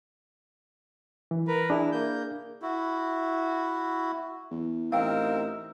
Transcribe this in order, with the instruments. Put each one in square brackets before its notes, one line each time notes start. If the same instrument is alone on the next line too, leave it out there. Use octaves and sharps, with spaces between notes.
[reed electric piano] E3
[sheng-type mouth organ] A#4 B4
[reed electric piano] D4 G#4 [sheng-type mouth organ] E4
[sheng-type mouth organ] A#3 G6
[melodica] E4 F#4
[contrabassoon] E2
[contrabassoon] A1 [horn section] C4 D#4 A#4 [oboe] E5 [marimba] F5 G5